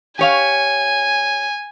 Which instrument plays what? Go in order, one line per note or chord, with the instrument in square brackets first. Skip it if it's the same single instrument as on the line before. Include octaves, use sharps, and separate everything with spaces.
[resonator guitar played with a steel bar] G4 C#5 F5 [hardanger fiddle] G#5